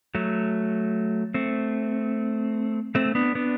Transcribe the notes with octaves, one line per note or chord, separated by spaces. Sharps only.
F#3 A3
A3 C4
A3 C4
B3 D4
B3 D4